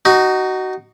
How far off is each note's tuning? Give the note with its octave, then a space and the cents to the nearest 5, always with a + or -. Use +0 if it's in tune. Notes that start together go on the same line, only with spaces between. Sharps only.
D#4 -15 F#4 +20